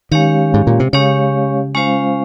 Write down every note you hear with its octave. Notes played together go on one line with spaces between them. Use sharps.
D#3 G#3 C#4 G4 C#5 F5
G#2
A#2
C3
C#3 G#3 C#4 G4 C#5 F5
G#3 C#4 F4 C5 F5